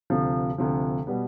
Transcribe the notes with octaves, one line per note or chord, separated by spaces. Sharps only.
D2 C3 F3
D2 C3 F3
B2 G3 B3